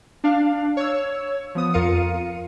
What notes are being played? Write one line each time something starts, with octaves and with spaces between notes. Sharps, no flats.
D4 F5
C#5 E6
F3 B3 D#6
F2 F4 A#4 F5 C#7 D#7